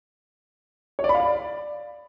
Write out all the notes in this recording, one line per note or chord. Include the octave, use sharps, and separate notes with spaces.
C#5
D5
B5
F5
D5